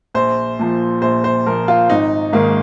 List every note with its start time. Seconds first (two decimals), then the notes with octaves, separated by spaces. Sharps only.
0.14 A#1 C5
0.59 A#2 F3
1.02 A#1 C5
1.24 C5
1.46 A#2 F3 A#4
1.68 F4
1.90 G#1 D#4
2.33 G#2 D#3 A#3